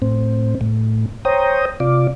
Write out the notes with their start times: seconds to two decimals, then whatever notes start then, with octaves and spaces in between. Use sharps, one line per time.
0.02 A2 C4
0.61 A2
1.25 C5 C#5 G5 A#5 D#6
1.80 C3 F4 D5